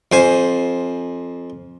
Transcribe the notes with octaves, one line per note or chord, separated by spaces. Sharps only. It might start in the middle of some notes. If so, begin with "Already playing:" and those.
F2 C5 G#5